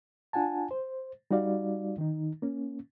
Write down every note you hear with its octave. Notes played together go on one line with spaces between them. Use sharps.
D4 F4 F#5 G#5 A5
C5
G3 D#4 F#4 D5 F5
D#3 D#4
A#3 C#4